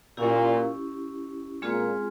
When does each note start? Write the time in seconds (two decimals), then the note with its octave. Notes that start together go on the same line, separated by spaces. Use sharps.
0.17 A#2 C#4 E4 G4
1.62 A#2 G#3 C4 F4 G#4